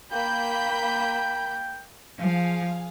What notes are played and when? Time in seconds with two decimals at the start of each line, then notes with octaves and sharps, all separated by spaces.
0.12 A#3 G5 B5 G6
2.19 F3 G#4 F5